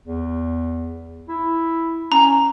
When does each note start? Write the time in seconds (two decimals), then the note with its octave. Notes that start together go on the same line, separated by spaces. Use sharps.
0.06 E2
1.29 E4
2.12 C#4 A#5